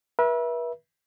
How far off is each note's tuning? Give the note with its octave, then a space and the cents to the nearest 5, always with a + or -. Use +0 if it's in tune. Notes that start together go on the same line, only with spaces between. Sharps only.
B4 -40 E5 +0